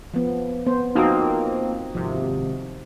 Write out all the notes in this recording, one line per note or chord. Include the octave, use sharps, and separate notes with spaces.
F3 B3
B3 C5
F3 A#3 C4 D#4 F#4 D#6
G#1 C3 F3